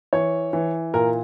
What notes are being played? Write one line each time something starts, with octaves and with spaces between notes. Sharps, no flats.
E3 C#5
E3
A#2 A#4